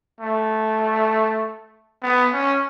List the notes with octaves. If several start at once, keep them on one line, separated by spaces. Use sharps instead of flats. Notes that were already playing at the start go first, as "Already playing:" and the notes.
A3
B3
C#4